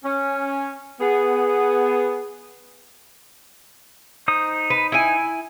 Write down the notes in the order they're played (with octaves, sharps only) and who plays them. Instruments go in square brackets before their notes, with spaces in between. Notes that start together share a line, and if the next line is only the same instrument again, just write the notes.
[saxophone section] C#4
B3 G#4
[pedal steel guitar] D#4 C5 D#6
[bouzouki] B4
E4 G#5